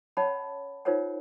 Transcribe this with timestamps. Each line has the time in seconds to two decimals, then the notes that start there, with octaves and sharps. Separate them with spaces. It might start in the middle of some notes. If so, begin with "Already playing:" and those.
0.17 C#4 C#5 D#5 F#5 A5 B5
0.85 D#4 F4 A#4 C5 C#5 F#5